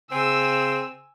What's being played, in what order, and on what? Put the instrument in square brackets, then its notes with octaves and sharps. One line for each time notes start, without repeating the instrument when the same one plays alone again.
[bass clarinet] C#3 [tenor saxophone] C4 [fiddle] G#5 [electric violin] E6